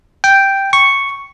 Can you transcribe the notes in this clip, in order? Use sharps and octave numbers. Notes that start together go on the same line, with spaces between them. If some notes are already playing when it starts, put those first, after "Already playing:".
G5
C#6